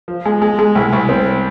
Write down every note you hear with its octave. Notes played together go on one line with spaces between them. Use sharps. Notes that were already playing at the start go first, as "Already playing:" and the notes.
F3
G#3
G#3
G#3
C2
C2
C4